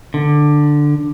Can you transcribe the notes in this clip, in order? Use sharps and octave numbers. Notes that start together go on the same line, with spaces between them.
D3